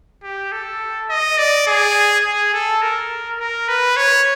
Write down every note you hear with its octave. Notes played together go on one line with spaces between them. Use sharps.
G4
A4
D#5
D5
G#4
G#4
A4
A#4
A#4
B4
C#5